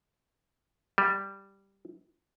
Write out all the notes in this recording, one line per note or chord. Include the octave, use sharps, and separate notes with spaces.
G3